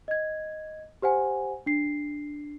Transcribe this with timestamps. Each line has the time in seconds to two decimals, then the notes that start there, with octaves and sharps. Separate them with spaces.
0.08 D#5 G#6
1.02 G4 C5 F#5 G#5
1.66 D4 C7